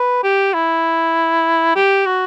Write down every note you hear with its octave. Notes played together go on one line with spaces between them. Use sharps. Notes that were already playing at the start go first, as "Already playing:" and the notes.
Already playing: B4
G4
E4
G4
F#4